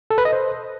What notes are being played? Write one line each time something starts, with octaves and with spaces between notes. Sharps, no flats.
A4
B4
D#5
C5